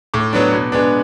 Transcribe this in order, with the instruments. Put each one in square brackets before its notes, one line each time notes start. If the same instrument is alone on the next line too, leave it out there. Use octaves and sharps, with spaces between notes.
[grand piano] A2 D6
F#3 B3 D4
B2
G#3 B3 D4